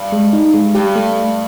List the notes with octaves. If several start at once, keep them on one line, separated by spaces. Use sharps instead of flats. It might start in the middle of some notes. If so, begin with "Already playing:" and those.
Already playing: G2
G#3
D#4
G#3
G2 G4
A3